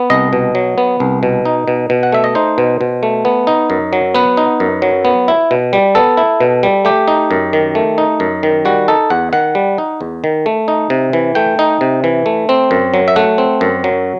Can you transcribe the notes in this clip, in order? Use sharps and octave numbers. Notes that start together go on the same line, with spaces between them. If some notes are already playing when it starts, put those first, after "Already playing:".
Already playing: B3
C2 D#5
B2
F#3
B3
C2
B2
D#4
B2
B2
F#5
A3 E5
D#5
D#4 C5
B2
B2
A3
B3
D#4
F#2
F#3
B3 B4
D#4
F#2
F#3
B3
E4
B2
G3
B3 A4
E4
B2
G3
A3 G4
D#4
F#2
D#3
A3
D#4
F#2
D#3
G3 F#4
D#4 A4
E2 F#5
D#3 F#5
G3
D#4
E2
D#3
A3
D#4
C3
E3
A3 G5
D#4
C3
E3
A3
C4
F#2
F#3
E5
A3 F#5
C4
F#2
F#3